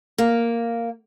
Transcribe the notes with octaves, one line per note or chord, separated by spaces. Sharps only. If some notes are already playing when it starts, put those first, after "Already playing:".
A#3